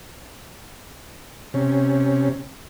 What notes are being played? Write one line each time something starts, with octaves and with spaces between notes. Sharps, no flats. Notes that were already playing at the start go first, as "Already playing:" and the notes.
C3 C#4